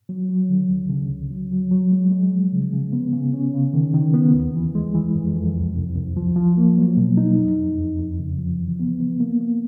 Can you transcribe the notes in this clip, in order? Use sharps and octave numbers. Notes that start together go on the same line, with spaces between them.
F#3
F#3
D3
C#2
C#3
C#2
F#3
F#3
F#3
G#3
G#3
F3
C#3
C#3
B3
C#3
C#4
C#3
D#3
D#3
B3
D#2
E3
G#3
E3
F2
F2
C2
C2
C2
F3
F3
A#3
F#3
B2
D#4
F2
F2
F2
F2
C#3
F3
E3
B3
B3
A#3
A#3